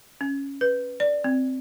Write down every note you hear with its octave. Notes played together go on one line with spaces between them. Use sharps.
C#4
B4
D5
C4